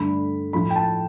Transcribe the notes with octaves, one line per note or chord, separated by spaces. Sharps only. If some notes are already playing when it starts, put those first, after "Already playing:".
Already playing: G2 D3 A3 B5
A2 F3 A3 B5
G5
A5